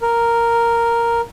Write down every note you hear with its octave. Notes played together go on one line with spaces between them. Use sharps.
A#4